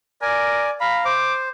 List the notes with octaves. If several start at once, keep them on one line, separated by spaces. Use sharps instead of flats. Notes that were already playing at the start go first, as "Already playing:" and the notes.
A#4 D5 G#5
F5 A#5 B5
C5 D6